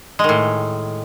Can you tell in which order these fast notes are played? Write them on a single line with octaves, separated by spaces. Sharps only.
G#3 D#3 A2